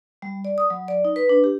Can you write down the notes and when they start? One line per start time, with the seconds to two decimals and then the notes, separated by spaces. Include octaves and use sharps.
0.22 G3
0.45 D5
0.58 D#6
0.70 F#3
0.88 D5
1.05 D#4
1.16 B4
1.29 D4
1.44 G4